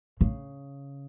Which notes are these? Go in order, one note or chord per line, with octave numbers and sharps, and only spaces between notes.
C#3